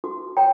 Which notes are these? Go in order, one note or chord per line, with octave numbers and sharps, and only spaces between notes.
F#4
C#5 G5 A#5